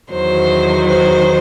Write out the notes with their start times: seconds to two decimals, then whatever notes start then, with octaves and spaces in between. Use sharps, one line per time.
0.11 E2 D#3 F#3 C5
0.88 C5